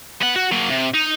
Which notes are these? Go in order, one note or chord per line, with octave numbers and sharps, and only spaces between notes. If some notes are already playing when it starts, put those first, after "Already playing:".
B3 F#5
F#4
F#3 A#3
C3
D#4